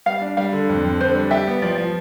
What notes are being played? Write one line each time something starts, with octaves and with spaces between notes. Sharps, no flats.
G3 F5
D4
G3 F5
D3
F2
F2
D3 C5
G3
G4 E5
B3
F3 D5
F3